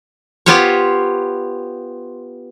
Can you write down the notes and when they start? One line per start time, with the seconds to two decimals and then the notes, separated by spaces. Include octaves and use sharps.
0.46 B3 F4 G4 C5 C#5